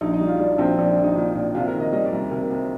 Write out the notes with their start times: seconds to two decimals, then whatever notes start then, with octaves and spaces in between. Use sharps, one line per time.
0.01 A#1 D#4
0.13 D#4
0.21 G3
0.27 F4
0.39 G3 D4
0.58 A#1 C4
0.78 A#1 D4
0.91 D4
0.97 A#1
1.04 D#4
1.16 A#2
1.35 A#2
1.55 C3 F4
1.68 A#4
1.74 D#3
1.80 D#5
1.93 G3 D#5
2.06 D5
2.12 C2
2.31 C3 A#4
2.51 C3